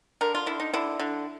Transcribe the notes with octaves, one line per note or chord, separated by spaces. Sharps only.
D3 A#4
F4
D3 E4
D#4
D3 E4
D3